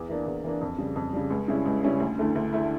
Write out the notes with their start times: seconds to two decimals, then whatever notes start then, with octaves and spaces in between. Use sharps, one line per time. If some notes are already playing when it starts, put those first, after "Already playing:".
Already playing: E2
0.09 E3 A#3 D4
0.26 E2
0.44 E3 A#3 D4
0.61 F2
0.78 C#3 G3
0.96 F2
1.13 C#3 G3
1.30 C#2
1.48 C#3 G3 C#4 E4
1.65 C#2
1.83 C#3 G3 C#4 E4
2.00 D2
2.18 D3 A3 E4
2.35 D2
2.53 D3 A3 E4